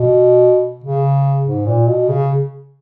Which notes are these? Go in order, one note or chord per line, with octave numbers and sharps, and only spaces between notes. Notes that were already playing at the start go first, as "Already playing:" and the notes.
Already playing: B2
C#3
G#2
A#2
B2
C#3